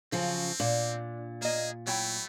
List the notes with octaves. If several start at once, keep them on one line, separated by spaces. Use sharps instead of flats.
C#3 F3 F#3 C4
A#2 D4
A#3 G#4 D#5
F#3 A3 E4 G5